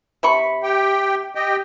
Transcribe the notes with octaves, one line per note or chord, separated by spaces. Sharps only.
C3 B5 C#6
G4 G5
G4 D#5 G5